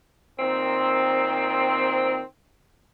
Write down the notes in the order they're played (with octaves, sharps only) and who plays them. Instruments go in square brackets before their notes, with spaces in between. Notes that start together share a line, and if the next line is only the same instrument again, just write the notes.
[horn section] A#2 D#3 C4